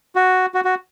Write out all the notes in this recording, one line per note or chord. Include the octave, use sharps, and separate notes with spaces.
F#4
F#4
F#4